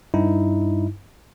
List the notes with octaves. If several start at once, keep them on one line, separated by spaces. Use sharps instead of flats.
G2 D#4 E4